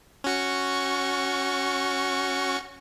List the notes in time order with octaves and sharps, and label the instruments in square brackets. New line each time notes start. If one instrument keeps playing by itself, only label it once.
[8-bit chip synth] C#4 F#4 C#6